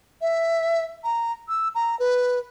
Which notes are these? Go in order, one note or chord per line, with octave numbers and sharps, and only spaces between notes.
E5
A#5
E6
A#5
B4